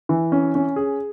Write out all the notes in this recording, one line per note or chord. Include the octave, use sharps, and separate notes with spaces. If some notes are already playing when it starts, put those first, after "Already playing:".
E3
C#4
C#4
G#4